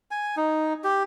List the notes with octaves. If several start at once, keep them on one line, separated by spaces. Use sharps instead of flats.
G#5
D#4
G4